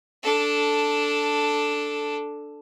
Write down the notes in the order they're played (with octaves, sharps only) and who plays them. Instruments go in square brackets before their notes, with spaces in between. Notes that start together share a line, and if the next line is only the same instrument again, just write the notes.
[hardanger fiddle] D4 A4